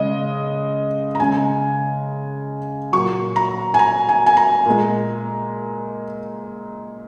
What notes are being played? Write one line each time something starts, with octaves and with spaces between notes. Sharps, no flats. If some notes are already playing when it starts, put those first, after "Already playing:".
Already playing: C#3 G#3 D#5
A#5
C#3 G#3 G#5
A#2 F#3 C#6
A#5
G#5
A#5
G#5
G#5
A#5
A#2 G#3